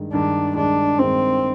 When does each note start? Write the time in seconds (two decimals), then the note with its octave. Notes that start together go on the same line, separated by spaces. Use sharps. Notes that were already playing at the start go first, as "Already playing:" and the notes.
Already playing: G2 D#3 G#3
0.13 G2 D#3 G#3 D4
0.55 G2 D#3 G#3 D4
0.99 G2 D#3 G#3 C4